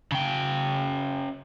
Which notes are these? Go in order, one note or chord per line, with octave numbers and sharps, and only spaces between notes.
C#3 G5